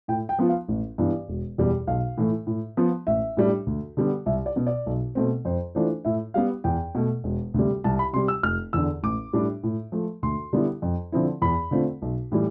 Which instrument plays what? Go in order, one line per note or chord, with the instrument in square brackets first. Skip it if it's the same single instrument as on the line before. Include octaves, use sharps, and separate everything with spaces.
[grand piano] A2 G5
G5
F3 B3 F4
F5
A1
G2 E3 B3
E1
E2 B2 G3
B1 F5
A2 E3 A3
A2
F3 B3 F4
A1 E5
A2 G3 D4
D2
D3 G3 B3
C2 E5
D5
B2 B3
D5
B1
B2 A3 C4
F2 C5
E3 A3 D4 F4 C5
A2 E5
G3 B3 F5
E2 G5
B2 A3
E1
D2 C3 G3
C2 A5
B5
C3 G3 C6
E6
F1 F6
E2 D3 E6
A1 D6
A2 G3 D4
A2
F3 A3
D2 C6
D3 G3 B3 E4
F2
D3 F3 C4 E4
E2 B5
D3 A3 C4 F4
B1
A2 E3 G3